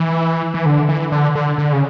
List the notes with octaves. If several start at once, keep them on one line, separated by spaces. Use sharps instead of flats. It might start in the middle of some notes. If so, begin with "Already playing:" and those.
Already playing: E3
E3
D3
E3
D3
D3
D3
C#3